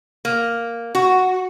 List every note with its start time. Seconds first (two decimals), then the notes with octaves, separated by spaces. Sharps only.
0.25 A#3
0.95 F#4